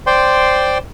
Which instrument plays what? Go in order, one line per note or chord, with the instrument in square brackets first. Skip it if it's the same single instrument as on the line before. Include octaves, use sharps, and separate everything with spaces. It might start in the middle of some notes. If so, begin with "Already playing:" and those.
[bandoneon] C5 D5 G5 C6